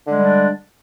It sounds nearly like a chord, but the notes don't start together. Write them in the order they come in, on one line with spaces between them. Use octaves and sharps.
D3 G#3 G3 D4